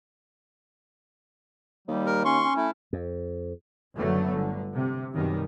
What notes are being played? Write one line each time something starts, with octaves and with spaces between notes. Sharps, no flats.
D#2 G3
A#4
C#4 C6 C#6
C#4
A3 E4
F2
F#1 D3 F#3 A3 B3
G1 D3
C3
F#2 B2 D#3 G3